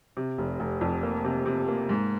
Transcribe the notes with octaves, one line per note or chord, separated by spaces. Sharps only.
C3
F1
F1
F2
A#3
C3
C3
A#3
G#2